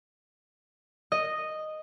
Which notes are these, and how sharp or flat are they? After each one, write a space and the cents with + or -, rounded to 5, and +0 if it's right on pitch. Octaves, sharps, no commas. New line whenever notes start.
D#5 -5